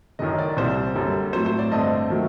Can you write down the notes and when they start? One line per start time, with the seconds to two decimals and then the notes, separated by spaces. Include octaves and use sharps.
0.19 F#1 F#2 D#3 D#5
0.39 D5
0.57 C2 A#2 G3 C5
0.95 F#2 D3 G3
1.33 A2 F#3 C4 C5
1.46 C5
1.59 D5
1.71 G2 D3 A3 C4 D#5
2.10 D#3 F#3 A3